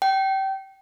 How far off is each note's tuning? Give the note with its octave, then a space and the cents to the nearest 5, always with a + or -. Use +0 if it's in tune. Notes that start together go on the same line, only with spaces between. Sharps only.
G5 -25